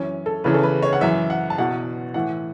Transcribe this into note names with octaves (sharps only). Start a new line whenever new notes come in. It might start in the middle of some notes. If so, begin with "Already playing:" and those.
Already playing: F#2 E3 C#4
A4
E2 C#3 E3 B4
A4
B4
C#5
F#5
F#2 E3 E5
F#5
A5
E2 B2 F#5
A2 E3 F#5